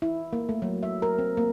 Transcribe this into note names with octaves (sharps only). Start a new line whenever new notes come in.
E4
A#3
A3
F#3
E5
A#4
C4
A#3